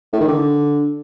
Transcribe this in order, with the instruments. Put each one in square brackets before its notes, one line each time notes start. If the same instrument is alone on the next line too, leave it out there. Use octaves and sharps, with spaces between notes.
[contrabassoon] A2
D#3
D3